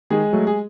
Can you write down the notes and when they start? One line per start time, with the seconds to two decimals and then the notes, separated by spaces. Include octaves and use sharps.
0.10 D#3 G#3 G#4
0.33 F#3 A3
0.47 G#4